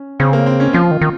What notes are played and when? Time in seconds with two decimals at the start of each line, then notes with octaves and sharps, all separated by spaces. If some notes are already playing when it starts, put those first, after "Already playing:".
Already playing: C#4
0.20 C#3 C4
0.33 A#3
0.46 C4
0.60 C#4
0.73 F3 F4
0.91 D#3
1.01 D#3